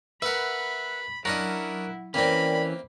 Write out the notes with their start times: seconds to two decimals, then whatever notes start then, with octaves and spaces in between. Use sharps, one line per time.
0.22 A#4 B4 E5 F#5 B5
1.25 F#3 C#4 D4 E4 A#4 D#5 F#5
2.14 E3 A#3 C4 C#4 A#4 D5 G5 B5